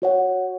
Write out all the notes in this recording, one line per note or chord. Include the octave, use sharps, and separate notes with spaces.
F#4 C#5 F#5